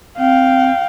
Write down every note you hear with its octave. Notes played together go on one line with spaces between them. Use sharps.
C4 F5 G5